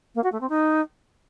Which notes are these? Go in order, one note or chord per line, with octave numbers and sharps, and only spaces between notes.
A#3
F#4
A3
C4
D#4